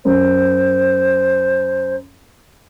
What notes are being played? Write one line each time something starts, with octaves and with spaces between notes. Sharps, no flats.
F#2 C5